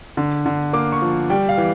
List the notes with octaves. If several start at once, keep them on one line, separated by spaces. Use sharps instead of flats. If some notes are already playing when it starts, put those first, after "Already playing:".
D3
D3
A#3 D6
C#6
F3
G3 G5
F5
E3